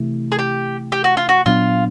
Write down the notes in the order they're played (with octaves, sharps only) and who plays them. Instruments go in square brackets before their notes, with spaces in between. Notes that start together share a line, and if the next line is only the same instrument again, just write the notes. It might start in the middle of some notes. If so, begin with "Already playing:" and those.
Already playing: [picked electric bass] C3 E3 A3
[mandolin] G#4
G4
G4
F#4
F4
F#4
[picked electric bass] A#2 F#3 B3 D4 [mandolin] F4